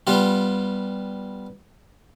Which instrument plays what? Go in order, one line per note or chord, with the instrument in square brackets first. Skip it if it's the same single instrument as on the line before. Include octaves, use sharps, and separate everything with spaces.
[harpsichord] G3 B3 F4 G4